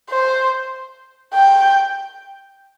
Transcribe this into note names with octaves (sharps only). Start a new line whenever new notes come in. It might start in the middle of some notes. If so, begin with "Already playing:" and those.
C5
G5